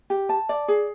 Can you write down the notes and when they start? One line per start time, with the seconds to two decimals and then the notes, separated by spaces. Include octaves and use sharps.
0.10 G4
0.29 A5
0.49 D5
0.68 G#4